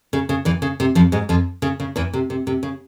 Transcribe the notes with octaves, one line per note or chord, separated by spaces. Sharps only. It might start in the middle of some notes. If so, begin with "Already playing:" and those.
C#3
C#3
E2 E3
C#3
C3
F2 F3
G#2 G#3
F2 F3
C#3
C#3
E2 E3
C3
C3
C3
C#3